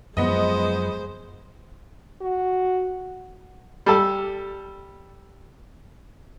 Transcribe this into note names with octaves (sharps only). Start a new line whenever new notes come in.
F#2 F3 G#3 B3 C5 D#5
F#4
G3 A4